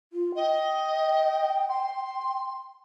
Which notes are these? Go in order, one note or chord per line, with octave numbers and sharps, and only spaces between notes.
F4
D#5 G5
C6